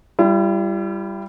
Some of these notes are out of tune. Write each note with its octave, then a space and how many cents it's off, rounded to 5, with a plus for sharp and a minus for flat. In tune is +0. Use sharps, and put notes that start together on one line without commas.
G3 +0 E4 +45